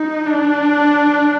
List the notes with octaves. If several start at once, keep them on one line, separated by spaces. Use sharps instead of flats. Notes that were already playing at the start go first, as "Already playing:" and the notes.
Already playing: D#4
D4